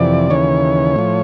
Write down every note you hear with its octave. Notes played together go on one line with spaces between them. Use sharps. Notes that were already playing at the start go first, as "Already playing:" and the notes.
Already playing: F2 C3 E3 D5
D#2 C#3 E3 C#5
A2 F3